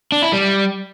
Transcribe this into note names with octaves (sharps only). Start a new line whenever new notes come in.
D4
E4
G3